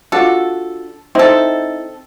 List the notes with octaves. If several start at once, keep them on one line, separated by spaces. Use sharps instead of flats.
D4 F4 F#4 A4
C4 D#4 E4 A4 D#5